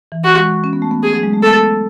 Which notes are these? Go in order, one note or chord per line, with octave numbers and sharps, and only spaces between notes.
E3
F#4
G#3
C#4
B3
A3
B3
G#4
F#3
G#3
A3
B3 A4